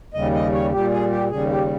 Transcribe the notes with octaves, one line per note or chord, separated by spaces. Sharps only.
D#2 C#3 G3 D#5
D#5
C#5
A#2 G3 G4
G#4
G4
D#2 C#3 G3 G#4
G4